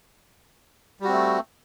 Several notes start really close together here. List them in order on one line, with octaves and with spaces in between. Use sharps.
G3 F#4 C4 A3